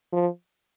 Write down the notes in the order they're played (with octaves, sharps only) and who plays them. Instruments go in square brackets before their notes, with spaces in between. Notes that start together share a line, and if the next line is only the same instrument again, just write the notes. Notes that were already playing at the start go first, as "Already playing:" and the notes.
[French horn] F3